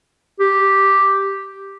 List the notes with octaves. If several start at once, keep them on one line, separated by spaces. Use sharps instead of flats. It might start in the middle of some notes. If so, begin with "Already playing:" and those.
G4